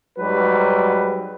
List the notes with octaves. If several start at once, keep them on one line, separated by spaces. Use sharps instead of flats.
G#2 F#3 G3 B4